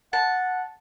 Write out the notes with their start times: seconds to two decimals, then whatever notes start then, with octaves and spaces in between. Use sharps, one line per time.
0.13 F#5 A5